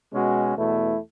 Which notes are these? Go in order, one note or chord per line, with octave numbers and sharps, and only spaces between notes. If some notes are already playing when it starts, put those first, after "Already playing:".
B2 G#3 C#4 F#4
E2 B2 A3 E4